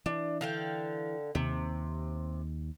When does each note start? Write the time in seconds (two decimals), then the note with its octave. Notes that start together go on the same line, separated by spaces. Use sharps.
0.06 E3 D4
0.41 D3 F5 G5
1.35 D#2 C3